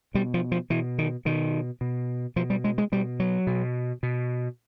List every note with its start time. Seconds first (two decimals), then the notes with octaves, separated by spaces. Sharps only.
0.14 B2 G3
0.34 F3
0.52 F3
0.70 B2 E3
0.98 D#3
1.25 B2 D#3
1.81 B2
2.36 B2 F3
2.50 G3
2.64 G#3
2.78 G#3
2.92 B2 G3
3.20 F#3
3.47 B2
4.03 B2